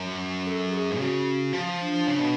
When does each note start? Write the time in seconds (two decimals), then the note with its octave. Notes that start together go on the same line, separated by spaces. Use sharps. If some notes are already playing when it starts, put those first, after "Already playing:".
Already playing: F#2
0.45 A4
0.72 G#4
0.98 C#3 F#4
1.53 F3
1.80 D4
2.07 C#3
2.19 B2